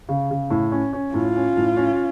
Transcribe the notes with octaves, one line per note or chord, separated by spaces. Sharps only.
C#3
C#3
A2
C#4
C#4
A2 F4
C#4
A2
C#4